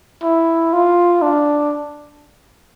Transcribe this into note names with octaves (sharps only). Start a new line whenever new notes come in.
E4
F4
D4